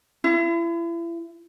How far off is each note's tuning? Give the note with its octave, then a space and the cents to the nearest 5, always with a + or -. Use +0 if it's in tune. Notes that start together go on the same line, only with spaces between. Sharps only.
E4 +35